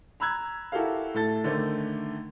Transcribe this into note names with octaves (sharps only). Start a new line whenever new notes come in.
A#5 B5 E6 F#6 G#6
E4 F#4 G4 A4 A#4 F5
A2 E4 A4 A6
D3 D#3 A3 C5